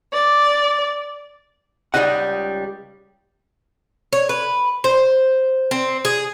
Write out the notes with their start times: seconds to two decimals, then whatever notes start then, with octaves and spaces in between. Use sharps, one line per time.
0.12 D5
1.94 C#2 E3 G3 D#4 D#5 F#5
4.13 C#5
4.29 B4
4.84 C5
5.71 C4
6.05 G#4